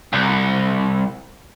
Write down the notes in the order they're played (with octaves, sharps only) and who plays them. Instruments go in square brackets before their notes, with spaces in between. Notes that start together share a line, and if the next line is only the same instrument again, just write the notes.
[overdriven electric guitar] C2